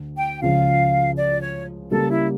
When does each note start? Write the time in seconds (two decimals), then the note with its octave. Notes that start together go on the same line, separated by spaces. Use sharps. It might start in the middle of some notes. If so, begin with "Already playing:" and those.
Already playing: D2 D4
0.17 G5
0.42 C#2 C#3 F3 F5
1.17 D5
1.41 C#5
1.91 C#3 G3 A#3 A4
2.09 E4